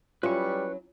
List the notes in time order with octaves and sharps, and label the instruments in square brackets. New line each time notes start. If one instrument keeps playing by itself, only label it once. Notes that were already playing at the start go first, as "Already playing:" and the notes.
[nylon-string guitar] F#3 C#4 E4 [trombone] G3 [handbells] F4 [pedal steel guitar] B4 C#6